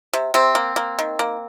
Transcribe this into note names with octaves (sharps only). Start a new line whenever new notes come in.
C3
C3 C4
A#3
A#3
D#3
A#3